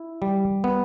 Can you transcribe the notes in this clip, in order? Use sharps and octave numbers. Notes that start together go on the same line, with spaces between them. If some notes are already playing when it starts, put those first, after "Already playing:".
Already playing: E4
G3
B3